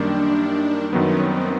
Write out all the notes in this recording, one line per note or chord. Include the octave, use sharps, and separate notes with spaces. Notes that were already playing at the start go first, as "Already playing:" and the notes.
Already playing: F#2 D#3 G3 A#3 D4
F#2 D#3 F#3 B3 C#4
C4